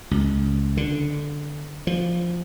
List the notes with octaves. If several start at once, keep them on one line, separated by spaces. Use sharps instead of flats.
C#2
D3
F3